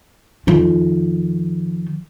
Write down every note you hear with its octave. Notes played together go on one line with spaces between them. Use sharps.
F2 D#3